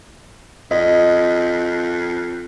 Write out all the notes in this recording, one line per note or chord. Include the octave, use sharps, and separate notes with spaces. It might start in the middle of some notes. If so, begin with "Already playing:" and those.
F2 D#5